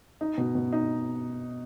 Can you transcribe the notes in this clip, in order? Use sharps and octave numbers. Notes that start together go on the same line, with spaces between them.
D#4
B2
B2
D#4